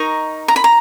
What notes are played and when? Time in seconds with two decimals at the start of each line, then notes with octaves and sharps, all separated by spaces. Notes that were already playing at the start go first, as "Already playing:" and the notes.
Already playing: D#4 A#4 D#5 C#6
0.48 A#5
0.56 B5
0.64 A#5